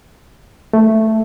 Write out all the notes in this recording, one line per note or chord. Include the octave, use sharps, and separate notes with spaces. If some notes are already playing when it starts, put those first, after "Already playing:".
A3